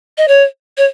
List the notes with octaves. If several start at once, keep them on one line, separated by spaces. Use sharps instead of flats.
D#5
C#5
C#5